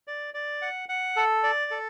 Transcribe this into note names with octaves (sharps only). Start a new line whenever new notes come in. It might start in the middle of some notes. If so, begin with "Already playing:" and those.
D5
D5
F#5
F#5
A4
D5
A4